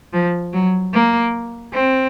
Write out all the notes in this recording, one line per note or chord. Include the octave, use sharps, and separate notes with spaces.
F3
F#3
A#3
C4